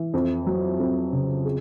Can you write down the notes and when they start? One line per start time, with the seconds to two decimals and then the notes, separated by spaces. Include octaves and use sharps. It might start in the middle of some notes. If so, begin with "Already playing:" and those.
Already playing: E3
0.13 F2
0.47 F#3
0.79 F2
1.12 C#3
1.45 G#4